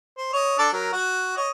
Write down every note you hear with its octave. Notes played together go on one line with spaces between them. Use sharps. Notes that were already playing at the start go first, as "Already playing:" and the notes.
C5
C#5 D#5
D4 A4 D5
F#3 A#4
F#4
C#5 D#5